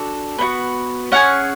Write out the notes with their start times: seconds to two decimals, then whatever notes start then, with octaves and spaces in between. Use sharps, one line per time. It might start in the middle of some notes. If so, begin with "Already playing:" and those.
Already playing: D4 F#4 A4
0.39 B3 D#4 F#4
1.12 C#4 F4 G#4 F#5